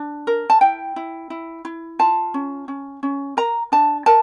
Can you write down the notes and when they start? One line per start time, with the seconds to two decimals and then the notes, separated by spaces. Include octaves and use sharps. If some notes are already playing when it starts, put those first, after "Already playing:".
Already playing: D4
0.27 A#4
0.50 A5
0.61 E4 G5
0.96 E4
1.30 E4
1.65 E4
1.99 F4 A5
2.34 C#4
2.68 C#4
3.03 C#4
3.37 A#4 A#5
3.72 D4 A5
4.06 A#4 A5